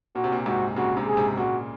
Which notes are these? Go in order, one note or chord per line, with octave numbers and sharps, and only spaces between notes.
A#2 F#4
C3
A#2
G#2 C3 F#4
A#2 C#3 F#4
G#2 C3
G#4
G#2 C3
A#2 C#3 F#4